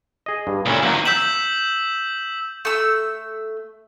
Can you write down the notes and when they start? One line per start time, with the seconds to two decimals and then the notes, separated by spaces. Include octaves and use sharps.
0.26 G#4 D#5
0.47 G2
0.66 C#2 A#2 A3 C#4 E4
0.82 E2 D#3 F#3 A#3
1.05 E6 G6 B6 E7 F#7
2.65 A3 E6